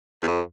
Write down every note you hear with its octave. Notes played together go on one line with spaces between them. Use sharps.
E2
F2